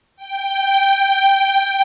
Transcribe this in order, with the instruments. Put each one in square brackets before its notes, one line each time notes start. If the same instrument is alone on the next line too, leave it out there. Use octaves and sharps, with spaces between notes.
[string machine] G5